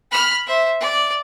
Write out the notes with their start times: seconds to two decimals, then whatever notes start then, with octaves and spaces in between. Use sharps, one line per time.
0.11 B5 F6
0.47 C5 E5
0.80 D5